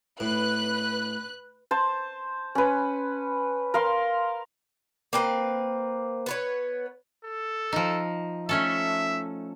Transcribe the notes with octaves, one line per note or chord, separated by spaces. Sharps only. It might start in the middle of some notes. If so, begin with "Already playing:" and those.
A2 B4 F#6
C5 A5
C#4 B4
A#4 F5 C6
A#3 C4 B4
B3 B4 C#5
A4
F3 D#4
A3 C#4 A4 E5